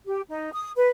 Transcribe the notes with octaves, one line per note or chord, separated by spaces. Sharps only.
G4
D#4
D#6
B4